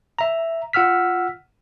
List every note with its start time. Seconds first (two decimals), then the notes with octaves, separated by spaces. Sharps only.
0.19 E5 A#5
0.73 F4 F#5 E6 F6 B6